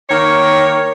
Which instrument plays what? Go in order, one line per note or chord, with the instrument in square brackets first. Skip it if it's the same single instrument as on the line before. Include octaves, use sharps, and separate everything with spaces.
[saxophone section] D#3 A#3 C#5